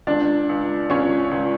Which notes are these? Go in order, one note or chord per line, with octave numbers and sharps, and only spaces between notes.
C#2 D4 D5
C#2
C#2 C#4 C#5
C#2